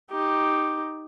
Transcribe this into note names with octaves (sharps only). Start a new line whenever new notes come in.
D#4 G4